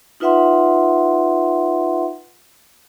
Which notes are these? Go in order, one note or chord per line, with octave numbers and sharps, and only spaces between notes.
D#4 F4 B4 E5 F#5 C6